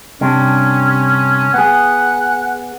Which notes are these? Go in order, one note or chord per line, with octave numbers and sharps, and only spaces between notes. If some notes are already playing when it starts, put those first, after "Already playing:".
G2 C3 C#4 D4
B3 G#4 F#5